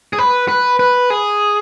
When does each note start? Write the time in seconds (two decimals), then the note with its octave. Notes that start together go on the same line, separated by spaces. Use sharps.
0.13 G#4
0.18 B4
0.48 B4
0.79 B4
1.10 G#4